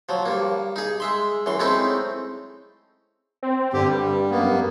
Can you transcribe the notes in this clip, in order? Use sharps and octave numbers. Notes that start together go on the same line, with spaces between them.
F3 F#3
G2 A#3
D#4 G#4
G#3 E5 C6
F#2 E3 C6
G#3 A3 C4 C#4 D#4 E4
C4
G2 D3 G4
G3
F#2 A#3 B3